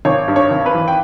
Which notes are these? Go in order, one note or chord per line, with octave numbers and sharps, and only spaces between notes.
G#1 C#5
G2
C#5
G#1
B4
E3
G5